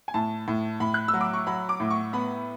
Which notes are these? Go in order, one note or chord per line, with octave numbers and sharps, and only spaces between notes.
G#5
A2 A5
A2
A2 B5
F#6
E6
F#3
D6
C#6
F#3 B5
D6
A2
C#6
B3 B5